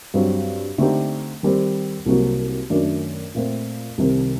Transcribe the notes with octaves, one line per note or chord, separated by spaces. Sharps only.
G2 F#3 C4
D3 A3 C4 D#4 G4
D#3 G3 C4
C2 C3 F#3 A#3 F#4
F#2 D#3 A3 D4 F#4
A#2 A3 C4
C2 C3 D#3